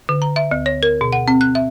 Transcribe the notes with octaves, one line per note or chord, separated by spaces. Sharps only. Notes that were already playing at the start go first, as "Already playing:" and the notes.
D3
A#5
E5
D2
C#5
A#4
B2
F#5
C4
F#6
E5